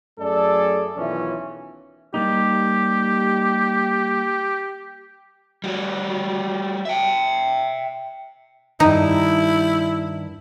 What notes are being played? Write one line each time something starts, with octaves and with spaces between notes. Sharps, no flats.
F#2 A3 G#4 A4 D5
B1 D#3 E3 C#4 F4 E5
G3 A#3 D#4 G4
G3 F#4
E5 G5
G2 D#3 D#4 E4